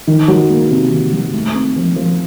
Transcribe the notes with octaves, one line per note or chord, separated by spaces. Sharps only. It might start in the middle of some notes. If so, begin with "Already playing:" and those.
D#3
F#3
A#3
C3
D#3
F#3
A3
C4
F3
F3